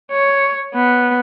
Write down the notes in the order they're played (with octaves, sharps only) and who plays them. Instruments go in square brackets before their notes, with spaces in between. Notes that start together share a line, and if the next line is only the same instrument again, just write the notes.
[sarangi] C#5
B3